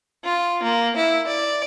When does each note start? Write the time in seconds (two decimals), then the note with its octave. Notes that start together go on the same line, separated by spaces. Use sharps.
0.24 F4
0.63 A#3
0.97 E4
1.27 D5